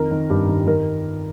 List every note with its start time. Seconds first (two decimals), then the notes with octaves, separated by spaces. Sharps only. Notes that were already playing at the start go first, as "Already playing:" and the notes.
Already playing: F2 D#3 A#4
0.11 D#3
0.30 G2 G4
0.48 D#3
0.67 D#3 A#4